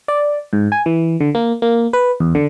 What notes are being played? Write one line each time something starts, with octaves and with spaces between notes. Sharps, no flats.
D5
G#2
G#5
E3
D3
A#3
A#3
B4
E2
D3